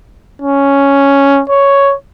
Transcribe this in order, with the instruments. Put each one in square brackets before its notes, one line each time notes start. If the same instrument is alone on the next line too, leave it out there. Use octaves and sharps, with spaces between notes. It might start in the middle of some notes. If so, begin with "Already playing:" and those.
[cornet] C#4
C#5